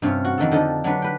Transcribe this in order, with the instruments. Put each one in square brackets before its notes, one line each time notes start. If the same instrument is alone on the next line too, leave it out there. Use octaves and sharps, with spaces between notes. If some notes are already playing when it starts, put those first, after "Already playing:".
[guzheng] G2 C3 C#4 F4
F#4
F2 D#3 A#3 A4
D3 F3 D#4 G4 A4 A#5
F#3 D4 B4
B4 G5